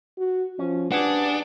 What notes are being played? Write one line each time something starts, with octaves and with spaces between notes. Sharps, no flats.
F#4
F3 C#4
D4 G4 G#4 B4 F#5